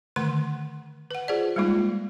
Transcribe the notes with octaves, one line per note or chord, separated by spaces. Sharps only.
D3 D#3 A3 F#5 C6
B4 F#5
F4 G#4 C5 D5
G3 G#3 A#3 D#4 F4